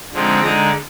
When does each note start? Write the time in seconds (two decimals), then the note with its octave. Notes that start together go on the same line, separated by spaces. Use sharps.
0.13 D3 F3 G#3 C4 D#4
0.43 D3 G#3 D#4 A#5